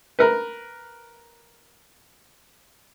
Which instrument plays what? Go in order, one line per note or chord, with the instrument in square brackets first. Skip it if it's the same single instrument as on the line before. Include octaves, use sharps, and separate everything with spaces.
[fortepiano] A#4 B4